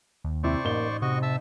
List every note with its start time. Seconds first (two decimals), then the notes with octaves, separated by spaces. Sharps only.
0.24 D#2
0.43 C3 E4 C5 D5 C#6
0.65 A1 A#3 D#4 G7
1.02 C3 F#4 D#5 C#6
1.23 E5 A5 E6